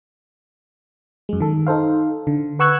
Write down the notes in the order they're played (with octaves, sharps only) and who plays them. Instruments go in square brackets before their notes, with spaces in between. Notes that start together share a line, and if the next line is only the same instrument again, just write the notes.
[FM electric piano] F#2 G#3
D#3 A4
D#4 A4 C5 F5
D3
B4 F#5 C#6 E6 F#6 G#6